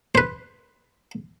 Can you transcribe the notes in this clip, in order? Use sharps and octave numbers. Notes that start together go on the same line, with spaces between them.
B4 C5